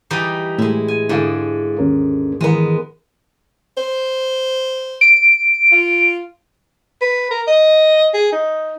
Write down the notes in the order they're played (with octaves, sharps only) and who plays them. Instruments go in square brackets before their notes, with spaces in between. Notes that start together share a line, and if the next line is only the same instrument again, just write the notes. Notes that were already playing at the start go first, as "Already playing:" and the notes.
[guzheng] E3 G3 D#4
[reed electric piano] A2 [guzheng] G#3 E4
[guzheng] G#5
[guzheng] G#2 D3 [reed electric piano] E4 G#4 F5
[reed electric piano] D#2 C#4 A#4
[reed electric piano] D#3 E3 A#4 [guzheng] G#3 B3
[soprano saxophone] C5
[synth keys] D7
[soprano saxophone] F4
B4
A#4
D#5
G#4
D#4